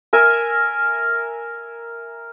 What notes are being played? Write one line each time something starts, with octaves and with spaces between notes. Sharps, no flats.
A#4 E5 G#5